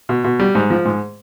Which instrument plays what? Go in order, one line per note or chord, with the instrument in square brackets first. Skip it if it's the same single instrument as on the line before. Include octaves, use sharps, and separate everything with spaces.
[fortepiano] B2
B2
G3
G#2
F3
G#2